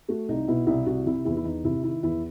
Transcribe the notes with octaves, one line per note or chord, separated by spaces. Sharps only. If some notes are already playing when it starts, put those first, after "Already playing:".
A3 F#4
C2 D#4
B2 E4
C2 E4
C2 F#4
C3 E4
E2 E4
E4
E2 D#4
C3 E4
D#3 E4
E2 E4